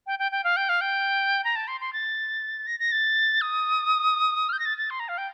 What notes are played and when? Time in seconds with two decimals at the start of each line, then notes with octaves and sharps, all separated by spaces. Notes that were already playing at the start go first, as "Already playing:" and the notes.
0.07 G5
0.19 G5
0.32 G5
0.44 F5
0.57 G5
0.69 F5
0.81 G5
1.44 A#5
1.56 A5
1.68 C6
1.80 C6
1.93 A6
2.67 A#6
2.79 A#6
2.92 A6
3.41 D#6
4.49 F6
4.53 G6
4.59 A#6
4.65 A6
4.78 A6
4.90 C6
5.00 A#5
5.08 F5
5.18 G5